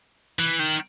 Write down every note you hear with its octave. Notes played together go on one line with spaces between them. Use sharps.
E3
D#3